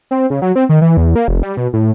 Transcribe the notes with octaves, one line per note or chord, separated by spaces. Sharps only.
C4
C#3
F#3
C4
D#3
E3
E2
A#3
F1
G3
B2
A2